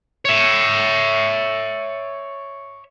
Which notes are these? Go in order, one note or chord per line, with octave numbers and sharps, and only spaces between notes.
C#5 E5